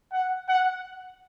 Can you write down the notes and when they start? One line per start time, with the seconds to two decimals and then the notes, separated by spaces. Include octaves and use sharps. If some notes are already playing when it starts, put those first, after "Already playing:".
0.12 F#5
0.49 F#5